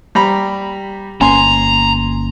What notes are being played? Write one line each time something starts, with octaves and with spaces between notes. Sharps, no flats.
G3 A#5 B5
G1 A#3 C#4 G#5 A#5 C6